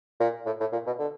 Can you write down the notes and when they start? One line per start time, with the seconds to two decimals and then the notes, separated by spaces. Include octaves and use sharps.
0.20 A#2
0.46 A2
0.61 A2
0.73 A#2
0.87 B2
0.99 D3